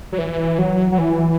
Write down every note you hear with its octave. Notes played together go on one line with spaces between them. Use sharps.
F#3
E3
F#3
F#3
E3